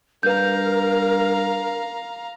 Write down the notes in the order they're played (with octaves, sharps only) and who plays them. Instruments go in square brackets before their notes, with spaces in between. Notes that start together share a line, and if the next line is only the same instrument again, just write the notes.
[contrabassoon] G2 [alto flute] A#4 [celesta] B4 G6 [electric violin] F5 A#5